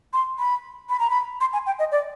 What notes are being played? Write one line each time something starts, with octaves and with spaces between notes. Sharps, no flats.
C6
B5
B5
A#5
B5
C6
G#5
G5
D#5
D5